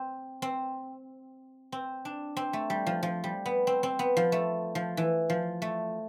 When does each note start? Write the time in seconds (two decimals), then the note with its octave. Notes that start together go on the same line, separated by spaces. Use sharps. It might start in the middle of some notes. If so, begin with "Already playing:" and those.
Already playing: C4
0.42 C4
1.72 C4
2.05 D4
2.37 C4
2.53 A3
2.70 G3
2.87 F3
3.03 F3
3.24 G3
3.46 B3
3.67 C4
3.83 C4
3.99 B3
4.17 F3
4.32 A3
4.75 F3
4.97 E3
5.30 F3
5.62 A3